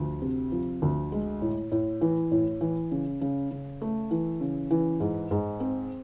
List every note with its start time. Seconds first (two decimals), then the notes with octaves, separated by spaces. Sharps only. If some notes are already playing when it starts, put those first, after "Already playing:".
Already playing: D2 F3
0.22 C3
0.52 F3
0.82 D2
1.12 G#3
1.42 A2
1.72 A2
2.01 E3
2.32 A2
2.61 E3
2.91 C#3
3.21 C#3
3.51 C#3
3.82 A3
4.11 E3
4.41 C#3
4.71 E3
5.00 G#2
5.31 G#2
5.60 C4